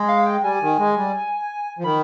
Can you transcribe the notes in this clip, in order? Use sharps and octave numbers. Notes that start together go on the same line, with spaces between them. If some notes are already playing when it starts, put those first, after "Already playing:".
Already playing: G#3
F5
G5
G3 G#5
D#3
G#3
G3
F3
D#3 B5